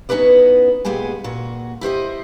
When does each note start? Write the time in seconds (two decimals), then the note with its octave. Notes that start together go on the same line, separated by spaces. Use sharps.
0.09 B3 C#4 D#4 E4 B4 D5
0.85 A#2 G#3 B3 G4 G#5
1.24 A#2 F#4
1.81 E4 G4 C5 D#5